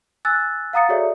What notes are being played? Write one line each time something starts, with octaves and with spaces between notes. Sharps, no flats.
G#5 E6 F#6 A6
F5 F#5 A#5 D#6 A6 C#7
F#4 G#4 A4 C#5 D5 E5